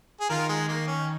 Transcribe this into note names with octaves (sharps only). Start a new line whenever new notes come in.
G#4
D#3 F4 A#4
G#3
A#3
C#4